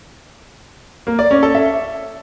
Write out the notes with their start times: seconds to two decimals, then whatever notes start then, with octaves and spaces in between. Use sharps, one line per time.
1.07 A#3
1.19 D5
1.31 C#4
1.43 A4
1.55 E5